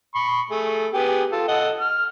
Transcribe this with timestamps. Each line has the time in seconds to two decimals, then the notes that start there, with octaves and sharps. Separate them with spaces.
0.15 B5 C#6
0.50 A3 G#4
0.93 B3 G4 G#4
1.32 F4 A4
1.48 A4 D#5 F#5
1.79 F6